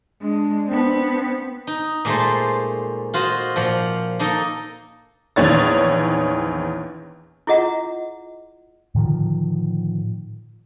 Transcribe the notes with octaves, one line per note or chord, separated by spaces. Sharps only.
G#3 D4
B3 C4
D#4
A#2 G#3 A3 C5
F4 F#4 C5 D#5
A#2 F3
A#3 D#4 A4 D#5
A#1 E2 D#3 C#5 A6
E4 F4 G#4 D#5 F#5 A#5
A2 D3 D#3 F3